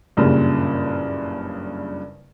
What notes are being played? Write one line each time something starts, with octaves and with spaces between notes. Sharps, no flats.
F#1 G2 A#2 C#3